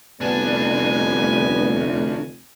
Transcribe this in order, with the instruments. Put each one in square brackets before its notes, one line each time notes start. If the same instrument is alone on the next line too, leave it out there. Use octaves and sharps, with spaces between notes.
[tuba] F1 [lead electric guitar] D2 D4 [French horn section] G3 B3 [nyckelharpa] G#5